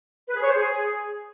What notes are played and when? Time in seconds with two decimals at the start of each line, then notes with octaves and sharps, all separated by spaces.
0.28 B4
0.35 G#4
0.42 C#5
0.48 C5
0.55 G#4